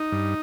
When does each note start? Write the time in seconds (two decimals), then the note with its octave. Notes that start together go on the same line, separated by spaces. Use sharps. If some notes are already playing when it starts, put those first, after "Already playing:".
Already playing: D#4
0.12 G2